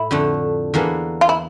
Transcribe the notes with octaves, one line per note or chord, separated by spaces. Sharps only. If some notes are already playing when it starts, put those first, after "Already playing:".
Already playing: A2 E4 A4
F2 D3 A3
E2 E3 A#3 D4 A4
F4
E4